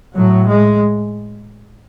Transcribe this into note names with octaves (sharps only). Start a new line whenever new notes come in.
A2 F#3
G#3